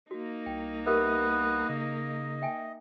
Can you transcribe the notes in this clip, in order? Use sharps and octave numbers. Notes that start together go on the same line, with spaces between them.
A#3 D#4 F#4
C2 G5
B3 G4 A#4 B4 E5
C#3 D#5
E5 G5 G#5